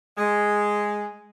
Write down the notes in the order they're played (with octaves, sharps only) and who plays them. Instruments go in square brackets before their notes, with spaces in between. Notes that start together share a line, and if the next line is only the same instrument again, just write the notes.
[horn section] G#3